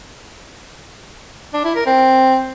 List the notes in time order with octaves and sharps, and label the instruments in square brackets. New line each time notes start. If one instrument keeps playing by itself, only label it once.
[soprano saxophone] D4
E4
A#4
C4